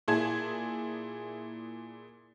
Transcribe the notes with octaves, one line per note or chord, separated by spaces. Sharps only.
A#2 E4 G#4 A5 G#6